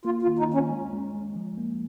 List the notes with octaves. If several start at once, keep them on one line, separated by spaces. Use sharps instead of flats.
A#3 F4
F4
D#3
D#4
D#3 C#4
G#3
G#3
G#3
F3
A#3